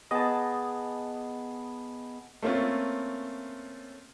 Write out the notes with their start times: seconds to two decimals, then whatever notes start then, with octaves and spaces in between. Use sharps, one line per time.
0.11 B3 G#4 D#5 A5 D6
2.43 A3 A#3 C4 C#4 F4